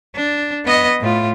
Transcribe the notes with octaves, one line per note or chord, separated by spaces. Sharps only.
D4
B3 D#5
A2 F4